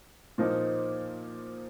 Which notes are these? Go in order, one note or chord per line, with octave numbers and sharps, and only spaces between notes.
A#2 F3 A#3 D#4